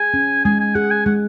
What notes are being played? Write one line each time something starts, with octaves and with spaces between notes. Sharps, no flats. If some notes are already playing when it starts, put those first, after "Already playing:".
Already playing: G#4 G#5
C#4
G#3 G#5
G#5
G#4 F#5
G#5
G#3 F#5